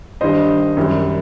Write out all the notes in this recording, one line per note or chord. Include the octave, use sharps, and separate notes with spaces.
G2 D#3 G3 C5 D#5
F#2 D#3 G3